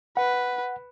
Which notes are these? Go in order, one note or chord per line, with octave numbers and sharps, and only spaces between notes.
B4 F#5